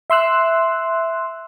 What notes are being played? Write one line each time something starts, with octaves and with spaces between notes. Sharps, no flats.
E5 C6 E6 F#6